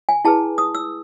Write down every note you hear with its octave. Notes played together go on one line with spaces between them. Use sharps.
G#5
E4 G#4 B4 A5
D#6
E6